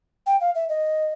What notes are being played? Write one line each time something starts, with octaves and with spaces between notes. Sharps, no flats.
G5
F5
E5
D#5